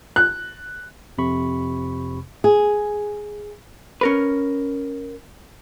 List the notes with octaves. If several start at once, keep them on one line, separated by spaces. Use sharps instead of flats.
F#6
F2 C3 B5 C#6
G#4
C#4 A#4 B4